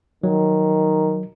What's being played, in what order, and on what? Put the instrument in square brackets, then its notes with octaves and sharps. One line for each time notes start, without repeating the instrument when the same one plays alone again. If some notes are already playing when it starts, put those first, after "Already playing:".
[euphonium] D#3 [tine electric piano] F#3